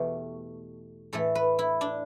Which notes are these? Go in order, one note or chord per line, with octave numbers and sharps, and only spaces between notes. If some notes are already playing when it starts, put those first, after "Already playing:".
Already playing: E2 B2 A3 G4
A2 E3 A3 A4
B4
E4
D4